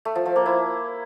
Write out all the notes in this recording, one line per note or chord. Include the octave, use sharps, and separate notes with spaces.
A3
F3
F3
A#3
E4